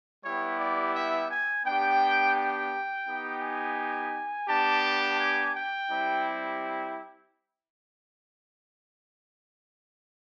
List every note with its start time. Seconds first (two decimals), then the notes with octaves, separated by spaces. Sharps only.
0.24 G3 B3 E4 G4 C#5
0.60 D5
0.95 E5
1.30 G#5
1.65 B3 D4 G4 G5
2.36 G5
3.08 B3 D#4 G4
3.42 G#5
4.49 B3 D4 G4 A5
5.20 G#5
5.55 G5
5.90 G3 C4 E4 G4